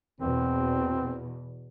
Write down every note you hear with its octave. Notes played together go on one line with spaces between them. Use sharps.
E2 B2 C4